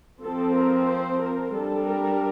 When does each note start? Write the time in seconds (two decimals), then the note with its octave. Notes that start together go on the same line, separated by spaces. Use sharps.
0.22 F3 C4 A4
0.55 A#4
0.87 C5
1.20 A#4
1.53 G3 D4 A4
1.86 A#4